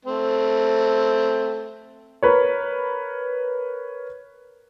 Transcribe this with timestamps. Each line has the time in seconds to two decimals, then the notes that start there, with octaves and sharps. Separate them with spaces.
0.05 A3 C4
2.23 A#4 B4 C#5